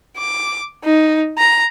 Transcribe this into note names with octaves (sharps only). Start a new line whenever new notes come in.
D6
D#4
A#5